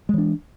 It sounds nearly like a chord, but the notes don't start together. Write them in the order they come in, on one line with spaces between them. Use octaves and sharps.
G#3 E3 D4